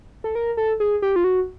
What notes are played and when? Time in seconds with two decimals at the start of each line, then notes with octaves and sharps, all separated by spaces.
0.24 A4
0.35 A#4
0.57 A4
0.80 G#4
1.02 G4
1.16 F4
1.24 F#4